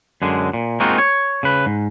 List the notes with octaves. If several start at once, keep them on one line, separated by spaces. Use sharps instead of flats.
F#2 D3 G#3
A#2
G#3 A#3 C4 D#4 F4 F#4
C#5
C#3 B4
G#2